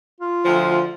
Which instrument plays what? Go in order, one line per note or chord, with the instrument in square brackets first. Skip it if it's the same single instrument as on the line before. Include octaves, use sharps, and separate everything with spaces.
[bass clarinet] F4
[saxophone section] D2 F3